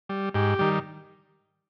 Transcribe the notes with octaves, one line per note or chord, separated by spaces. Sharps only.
G3
G#2 G4
D#3 G3